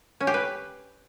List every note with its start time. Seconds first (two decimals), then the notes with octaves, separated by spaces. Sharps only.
0.20 C#4
0.27 G4
0.34 B4